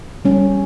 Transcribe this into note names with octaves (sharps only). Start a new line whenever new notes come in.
G3 C#4